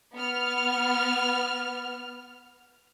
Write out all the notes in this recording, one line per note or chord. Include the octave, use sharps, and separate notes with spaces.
B3 F6